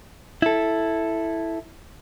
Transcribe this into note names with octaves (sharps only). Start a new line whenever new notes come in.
E4 A4